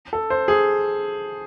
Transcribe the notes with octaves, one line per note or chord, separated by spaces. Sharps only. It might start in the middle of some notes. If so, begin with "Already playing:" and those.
A4
C5
G#4